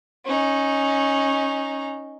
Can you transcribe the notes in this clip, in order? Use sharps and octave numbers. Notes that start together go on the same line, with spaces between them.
C#4 D#4